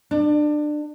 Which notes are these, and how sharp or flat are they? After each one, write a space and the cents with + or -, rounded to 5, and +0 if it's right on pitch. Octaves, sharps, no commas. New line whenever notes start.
D4 +25